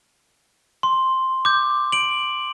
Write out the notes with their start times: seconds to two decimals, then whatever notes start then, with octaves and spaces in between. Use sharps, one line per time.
0.83 C6
1.45 D6 G6
1.92 D7 F#7